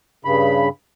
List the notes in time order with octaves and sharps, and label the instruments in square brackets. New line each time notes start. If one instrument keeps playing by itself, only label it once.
[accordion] G2 C#3 B5